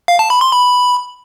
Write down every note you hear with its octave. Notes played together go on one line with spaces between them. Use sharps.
F5
A5
B5
C6
B5